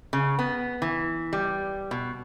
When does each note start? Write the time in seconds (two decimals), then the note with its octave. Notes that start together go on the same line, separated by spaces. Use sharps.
0.13 C#3
0.39 B3
0.82 E3
1.33 G3
1.91 B2